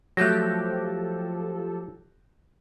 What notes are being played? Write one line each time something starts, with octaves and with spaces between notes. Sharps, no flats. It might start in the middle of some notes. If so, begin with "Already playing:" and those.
F3 F#3 A3 G4 A4 F#6 G6 A#6